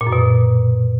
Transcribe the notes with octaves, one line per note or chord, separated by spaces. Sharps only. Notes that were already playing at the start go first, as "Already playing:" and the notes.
A#2
F#2
B2